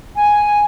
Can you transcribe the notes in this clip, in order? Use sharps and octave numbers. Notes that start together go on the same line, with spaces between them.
G#5